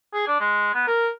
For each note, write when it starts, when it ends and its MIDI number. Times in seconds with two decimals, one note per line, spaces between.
0.13 0.24 68
0.27 0.35 62
0.40 0.74 56
0.74 0.87 59
0.87 1.09 70